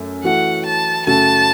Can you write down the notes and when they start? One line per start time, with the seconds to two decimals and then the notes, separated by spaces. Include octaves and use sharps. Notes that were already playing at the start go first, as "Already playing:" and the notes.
Already playing: F#2 A3 C#5
0.23 E3 A3 F#4 F#5
0.65 A5
1.06 F#2 C#3 A3 F#4 A5